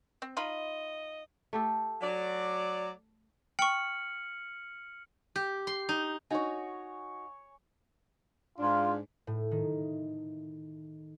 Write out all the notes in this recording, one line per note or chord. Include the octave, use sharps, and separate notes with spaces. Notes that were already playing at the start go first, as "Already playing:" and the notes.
C4
D#4 F4 D#5 B5
A3 G4 A4
F#3 D5
G5 C#6 F6 C#7 F#7
G4
C6
D#4
D#4 F#4 C#5 G#5
G#2 D4 F4
A2
D#3